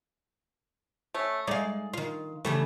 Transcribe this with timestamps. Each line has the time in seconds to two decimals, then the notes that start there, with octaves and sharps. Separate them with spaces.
1.14 A3 C#4
1.47 G#3 A3 D#4 D5 F5
1.93 D#3 F4 F5
2.45 C#3 E3 G3 A3